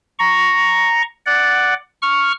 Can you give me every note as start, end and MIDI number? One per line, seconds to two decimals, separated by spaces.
0.19 1.02 82
0.19 1.02 85
1.26 1.74 74
1.26 1.74 78
2.02 2.32 85
2.02 2.32 89